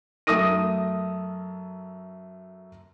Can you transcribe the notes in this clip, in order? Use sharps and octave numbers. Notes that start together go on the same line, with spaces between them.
F#2 A3 D#6 A#6 D#7